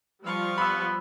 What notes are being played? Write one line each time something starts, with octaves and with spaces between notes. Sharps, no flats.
F3 G3 F4 F5 C#6
B3 B5 E6